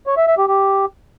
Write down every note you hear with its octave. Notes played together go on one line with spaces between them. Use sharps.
C#5
E5
E5
G4
G4